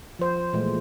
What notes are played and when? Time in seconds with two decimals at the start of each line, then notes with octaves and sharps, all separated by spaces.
0.19 F3 C5
0.53 A#2 E3 G#3 A3